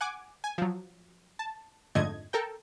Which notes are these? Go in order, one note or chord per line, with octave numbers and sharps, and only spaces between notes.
F#5 G#5 D6
G#5
F3 F#3
A5
F2 G#2 D3 A3 D#5 G#6
A4 A#4 G5